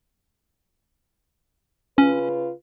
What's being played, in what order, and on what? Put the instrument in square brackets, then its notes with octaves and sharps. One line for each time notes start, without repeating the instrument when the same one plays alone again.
[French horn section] C#3 F4 B4 [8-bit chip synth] C#4